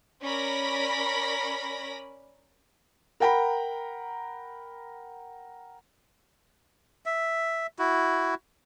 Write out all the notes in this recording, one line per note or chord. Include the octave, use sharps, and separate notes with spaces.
C#4 A#4 D5 B5 A#6 B6
A#4 F#5 G5 A#5 B5
E5
E4 F#4